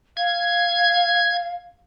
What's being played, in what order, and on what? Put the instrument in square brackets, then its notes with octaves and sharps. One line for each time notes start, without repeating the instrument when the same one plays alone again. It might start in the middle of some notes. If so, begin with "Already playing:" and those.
[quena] F5 [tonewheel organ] G#6